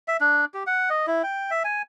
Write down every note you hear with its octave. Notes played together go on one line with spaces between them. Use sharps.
E5
D4
G4
F#5
D#5
E4
G5
E5
G#5